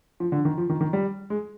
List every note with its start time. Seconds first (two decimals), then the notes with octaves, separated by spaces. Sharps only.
0.20 F3
0.32 D3
0.45 D#3
0.58 F3
0.70 D#3
0.81 D#3
0.93 G3
1.30 G#3